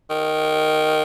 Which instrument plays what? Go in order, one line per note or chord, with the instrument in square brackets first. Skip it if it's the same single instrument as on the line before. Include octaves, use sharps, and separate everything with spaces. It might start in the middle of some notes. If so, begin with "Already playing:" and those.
[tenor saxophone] D#3